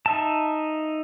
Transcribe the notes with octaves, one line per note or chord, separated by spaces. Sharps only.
D#4 E5 A5